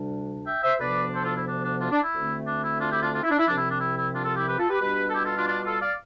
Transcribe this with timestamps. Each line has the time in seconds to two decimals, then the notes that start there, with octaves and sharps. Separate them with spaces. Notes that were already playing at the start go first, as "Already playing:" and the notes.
Already playing: D2 C3 G3 D4
0.46 E5 G5
0.63 C5 E5
0.79 D2 C3 F3 B3 D4 B4 D5
1.12 A4 C5
1.24 F4 A4
1.36 E4
1.46 D4
1.63 D4
1.79 D4 F4
1.91 D4
2.02 E4
2.13 D2 D3 A3 C4
2.46 D4
2.64 E4
2.80 D4 F4
2.91 E4 G4
3.02 D4 F4
3.13 D4 F4
3.22 E4
3.30 D4
3.38 E4
3.47 C2 C3 F3 C4 D4
3.57 E4
3.70 D4
3.80 E4
3.97 E4
4.13 D4 F4
4.24 F4 A4
4.36 E4 G4
4.47 G4 B4
4.58 F4 A4
4.69 G4 B4
4.80 B2 G3 D4 G4 B4
5.08 A4
5.14 E4 G4
5.24 F4 A4
5.36 D4 F4
5.47 D4 F4
5.63 F4 A4
5.80 D5 F5